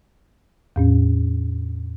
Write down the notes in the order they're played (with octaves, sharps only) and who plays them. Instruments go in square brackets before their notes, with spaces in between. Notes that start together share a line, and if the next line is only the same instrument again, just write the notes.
[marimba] E2 A2 C#4